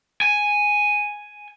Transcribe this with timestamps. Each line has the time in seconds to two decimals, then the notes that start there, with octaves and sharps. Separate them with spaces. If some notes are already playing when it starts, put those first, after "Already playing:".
0.22 G#5